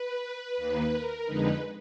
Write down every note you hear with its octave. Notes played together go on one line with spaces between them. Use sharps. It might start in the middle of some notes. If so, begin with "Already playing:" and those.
Already playing: B4
D#2 D#3 A#3
A#4
F2 D3 G#3 D#4 B4